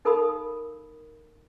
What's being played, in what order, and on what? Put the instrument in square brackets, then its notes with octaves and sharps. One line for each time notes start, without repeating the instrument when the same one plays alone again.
[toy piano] D#4 A4 A#4 F5 B5 D#6